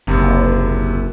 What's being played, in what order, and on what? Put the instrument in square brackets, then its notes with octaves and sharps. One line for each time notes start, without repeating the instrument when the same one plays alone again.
[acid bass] F#1 [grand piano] D#2 C3